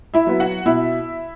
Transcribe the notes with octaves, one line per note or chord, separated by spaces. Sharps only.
E4 E5
F#3 B3
F#4 F#5
B2 E4 E5